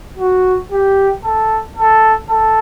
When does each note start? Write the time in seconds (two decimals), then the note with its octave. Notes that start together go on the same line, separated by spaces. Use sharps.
0.19 F#4
0.72 G4
1.24 A4
1.77 A4
2.29 A4